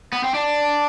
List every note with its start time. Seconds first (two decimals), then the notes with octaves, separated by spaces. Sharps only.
0.13 B3
0.24 C4
0.34 D4